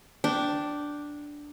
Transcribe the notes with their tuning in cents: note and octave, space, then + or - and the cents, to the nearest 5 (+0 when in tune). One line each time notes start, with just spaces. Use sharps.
D4 +0 G5 -15